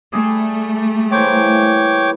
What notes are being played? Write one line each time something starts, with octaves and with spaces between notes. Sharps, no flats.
G3 A3 G#4 D5
E3 A#3 C5 C#5 G5 D6